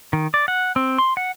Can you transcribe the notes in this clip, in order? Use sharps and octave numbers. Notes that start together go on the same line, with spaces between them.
D#3
D5
F#5
C4
C6
F#5